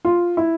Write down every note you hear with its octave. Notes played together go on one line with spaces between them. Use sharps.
F4
E4